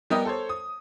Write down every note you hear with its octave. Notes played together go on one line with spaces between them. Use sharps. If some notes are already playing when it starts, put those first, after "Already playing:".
G3 B3 G4 A#4 D#5
A4 C5 C#5
D#6